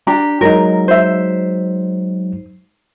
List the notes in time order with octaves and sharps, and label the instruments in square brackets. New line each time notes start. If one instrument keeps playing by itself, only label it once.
[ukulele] D4 G4 A#5
[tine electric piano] F#3 G#3 D#4 [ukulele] A#4
[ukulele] C5 E5